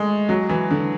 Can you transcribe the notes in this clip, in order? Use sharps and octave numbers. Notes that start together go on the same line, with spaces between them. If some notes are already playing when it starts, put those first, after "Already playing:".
Already playing: G#3 A3
F#3
E3
D3